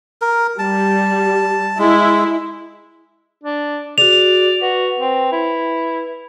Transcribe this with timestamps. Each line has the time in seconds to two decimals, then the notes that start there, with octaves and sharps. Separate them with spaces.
0.21 A#4
0.59 G3 A5
1.79 G#3 E4
3.44 D4
3.98 F#4 G#4 D5 F7
4.61 F#4 B4
4.99 C4
5.32 E4